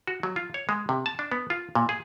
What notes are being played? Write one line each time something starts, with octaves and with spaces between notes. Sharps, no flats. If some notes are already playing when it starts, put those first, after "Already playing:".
F#4
F#3
F4
C#5
G#3
C3
A5
D4
B3
F4
A#2
G#4